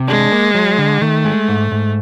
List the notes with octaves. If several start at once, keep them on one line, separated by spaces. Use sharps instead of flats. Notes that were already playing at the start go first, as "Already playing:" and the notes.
Already playing: C3
G#3 D4
A#3
F#3
D3
D#3 A3
G#3
G#2
G#2